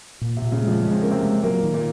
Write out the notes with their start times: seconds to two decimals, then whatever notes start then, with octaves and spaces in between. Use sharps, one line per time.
0.21 A#2
0.37 C3
0.42 A#2
0.52 C#3
0.63 F2 F3 G#3
0.83 G#3 C#4
0.92 C4
1.02 A#3 C#4
1.11 C3 C4
1.23 G#3
1.43 A#2 F#3 A#3
1.64 D#3
1.74 A#2 A#3